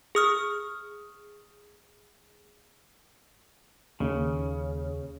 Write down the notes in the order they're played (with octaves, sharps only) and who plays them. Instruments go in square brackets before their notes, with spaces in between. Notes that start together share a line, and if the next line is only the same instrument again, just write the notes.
[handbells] G#4 D#6 F6
[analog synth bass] D#2 [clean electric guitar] C#3